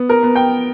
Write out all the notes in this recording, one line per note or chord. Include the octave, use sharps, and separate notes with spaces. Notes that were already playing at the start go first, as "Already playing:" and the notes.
Already playing: B3
A#4
B3
G5